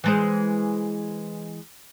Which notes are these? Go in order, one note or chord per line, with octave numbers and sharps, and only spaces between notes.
E3 G#3 C5